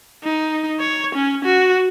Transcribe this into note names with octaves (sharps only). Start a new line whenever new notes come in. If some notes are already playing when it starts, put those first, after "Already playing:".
D#4
C#5
C#4
F#4